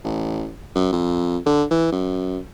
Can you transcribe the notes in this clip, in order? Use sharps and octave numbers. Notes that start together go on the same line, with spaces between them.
A1
F#2
F2
D3
E3
F#2